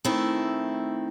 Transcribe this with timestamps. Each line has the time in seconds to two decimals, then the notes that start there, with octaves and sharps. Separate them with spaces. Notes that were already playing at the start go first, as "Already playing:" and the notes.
0.05 D#3 A3 C4 E4